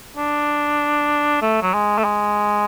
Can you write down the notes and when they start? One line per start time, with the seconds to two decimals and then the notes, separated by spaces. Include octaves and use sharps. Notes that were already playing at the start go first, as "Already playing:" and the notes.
0.17 D4
1.42 A3
1.63 F#3
1.74 G#3
1.98 A3
2.04 G#3